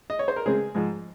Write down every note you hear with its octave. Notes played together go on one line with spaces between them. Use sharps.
D#5
C#5
C5
A#4
C#3 G#3 C4 G#4
G#2 F3 G#3